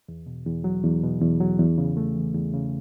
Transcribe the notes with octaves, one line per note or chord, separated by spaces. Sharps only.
E2
B2
E2
F#3
E2
B2
E2
F#3
E2
C#3
A3
E3
E2
C#3